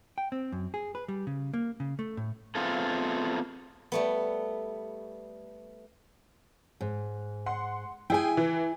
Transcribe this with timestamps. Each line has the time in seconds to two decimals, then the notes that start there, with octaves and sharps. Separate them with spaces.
0.18 G5
0.32 C4
0.52 F#2
0.74 G#4
0.95 B4
1.08 G3
1.27 C#3
1.54 A#3
1.80 C#3
1.99 A3
2.17 A2
2.55 A3 B3 C4 F4 G#4 A4
3.92 G3 A3 B3
6.81 G#2
7.46 F#5 C6
8.10 E4 G#4 G5 G#5
8.37 E3